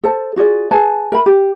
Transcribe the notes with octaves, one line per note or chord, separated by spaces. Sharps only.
A4 C5 A5
F4 F#4 G#4 D5
G#4 B4 G#5 A5
A#4 E5 B5
G4